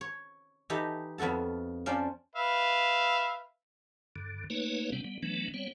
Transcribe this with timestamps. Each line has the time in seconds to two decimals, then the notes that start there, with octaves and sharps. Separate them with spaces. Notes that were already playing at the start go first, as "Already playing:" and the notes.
0.01 C#5
0.70 E3 D#4 G4 A4 A#5 B5
1.18 F2 B3 F#4 A4 A5
1.86 C#4 D4 F4 C5 D5
2.35 B4 E5 F5
4.16 G2 D3
4.50 A3 A#3 D#4 B4 C#5
4.92 C3 G3 B3 C4 D4
5.04 G3 B3
5.23 E3 F#3 A3 B3 D4
5.54 G3 B3 C4 C#5